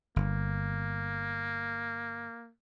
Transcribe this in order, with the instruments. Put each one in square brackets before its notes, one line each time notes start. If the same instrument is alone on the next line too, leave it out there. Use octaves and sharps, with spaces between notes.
[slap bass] G1 [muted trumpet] A#3